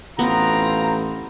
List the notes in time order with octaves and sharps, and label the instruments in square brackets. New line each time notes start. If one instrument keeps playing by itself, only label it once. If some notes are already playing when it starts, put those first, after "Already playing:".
[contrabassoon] A1 [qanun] B3 [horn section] C4 F4 A#5